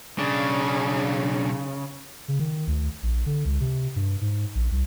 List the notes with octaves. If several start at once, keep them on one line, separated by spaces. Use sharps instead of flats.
B1 C#3 D4
C#3
D#3
D2
A#1
D3
C#2
C3
G2
G#2
A#1
C2